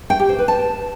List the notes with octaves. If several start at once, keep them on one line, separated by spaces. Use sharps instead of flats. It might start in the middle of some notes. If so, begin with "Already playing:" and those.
G5
G4
C5
B4
A5